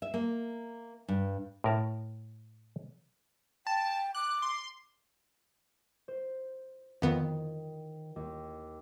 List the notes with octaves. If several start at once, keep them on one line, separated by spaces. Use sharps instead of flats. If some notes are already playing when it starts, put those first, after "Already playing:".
E5
A#3
G2
A2 A#4 A5
G5 A5
D6 F#6
C6
C5
F2 D#3 B3
D#2